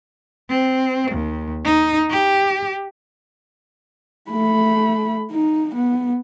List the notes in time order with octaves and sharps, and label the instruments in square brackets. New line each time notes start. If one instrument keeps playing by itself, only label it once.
[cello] C4
D#2
D#4
G4
[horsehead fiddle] A3 B5
D#4
B3